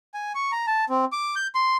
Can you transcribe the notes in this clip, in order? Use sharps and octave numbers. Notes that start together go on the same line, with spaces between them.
G#5
C#6
A#5
A5
C4
D6
G6
C6